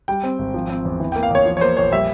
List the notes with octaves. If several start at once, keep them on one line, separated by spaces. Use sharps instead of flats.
G3 G5
C4
G#1
F3
C4
E2
E3
A#3 G5
F5
E2 C#5
F3
C#5
A#3 C5
A#1 C#5
G3 E5